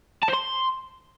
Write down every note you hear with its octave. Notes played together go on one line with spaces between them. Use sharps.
A5
C5
C6